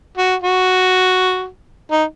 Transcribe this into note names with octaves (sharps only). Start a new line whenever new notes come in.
F#4
F#4
D#4